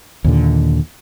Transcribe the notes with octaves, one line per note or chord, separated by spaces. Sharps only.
D#2 A#2 D3